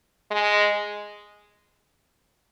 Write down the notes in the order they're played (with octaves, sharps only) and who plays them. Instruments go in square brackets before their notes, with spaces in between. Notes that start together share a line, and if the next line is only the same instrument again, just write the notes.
[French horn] G#3